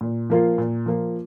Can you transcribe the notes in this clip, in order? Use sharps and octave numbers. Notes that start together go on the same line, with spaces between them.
A#2
F3 A#3 F4
A#2
F3 A#3 F4